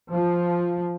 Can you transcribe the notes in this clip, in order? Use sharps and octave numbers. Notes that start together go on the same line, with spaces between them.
F3